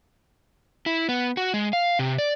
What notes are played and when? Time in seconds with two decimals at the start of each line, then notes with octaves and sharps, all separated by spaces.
0.86 E4
1.09 B3
1.37 F#4
1.54 G#3
1.73 F5
1.99 C3
2.18 D5